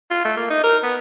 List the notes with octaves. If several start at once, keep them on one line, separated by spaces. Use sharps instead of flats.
F4
A3
A#3
D#4
A#4
B3